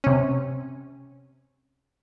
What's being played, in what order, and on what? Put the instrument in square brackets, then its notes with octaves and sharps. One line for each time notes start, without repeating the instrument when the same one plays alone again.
[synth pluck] C3 C#4